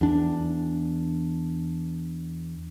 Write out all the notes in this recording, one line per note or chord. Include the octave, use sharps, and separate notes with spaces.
E2 D4